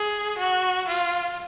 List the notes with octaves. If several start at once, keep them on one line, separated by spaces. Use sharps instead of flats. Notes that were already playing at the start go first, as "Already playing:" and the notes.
Already playing: G#4
F#4
F4